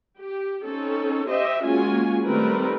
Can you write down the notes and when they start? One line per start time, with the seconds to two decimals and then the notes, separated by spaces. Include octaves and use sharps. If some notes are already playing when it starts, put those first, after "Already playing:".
0.19 G4
0.67 C4 C#4 D#4 A4
1.29 G4 C5 D#5 E5
1.62 G#3 A#3 C#4 F4 F#4 G#5
2.26 D#3 G3 A3 C4 A#4 B4